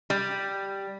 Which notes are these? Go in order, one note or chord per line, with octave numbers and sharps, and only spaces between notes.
G3